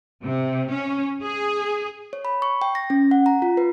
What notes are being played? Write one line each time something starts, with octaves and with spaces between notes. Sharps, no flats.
C3
C#4
G#4
C#5
B5
C#6
G5
A#6
C#4
F#5
A#5
F4
B4